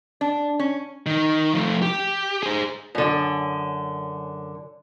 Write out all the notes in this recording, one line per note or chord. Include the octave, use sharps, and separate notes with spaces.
D4
C#4
D#3
F3 A3
G4
G#4 C5
F#2 D3